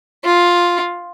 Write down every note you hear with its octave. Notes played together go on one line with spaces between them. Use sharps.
F4